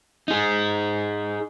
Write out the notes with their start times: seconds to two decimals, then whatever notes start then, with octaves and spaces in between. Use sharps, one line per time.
0.28 D#4 G#4